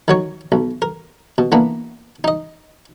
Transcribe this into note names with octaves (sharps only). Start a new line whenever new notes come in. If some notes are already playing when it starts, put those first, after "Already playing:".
D#3 F#3 C#5
B1
A#4
B2
E3 A#3 B3 D4
D#4 D#5